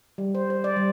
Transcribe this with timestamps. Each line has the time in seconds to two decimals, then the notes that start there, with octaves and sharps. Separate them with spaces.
0.18 G3
0.35 C5
0.50 C5
0.64 D5
0.77 G3